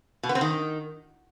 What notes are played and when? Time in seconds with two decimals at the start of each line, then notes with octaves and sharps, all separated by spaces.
0.23 B2
0.29 B3
0.35 C4
0.41 D#3